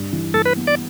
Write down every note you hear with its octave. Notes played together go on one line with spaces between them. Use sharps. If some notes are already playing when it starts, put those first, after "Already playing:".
Already playing: G2 D4
E3
G2 A4
B4
B3
D5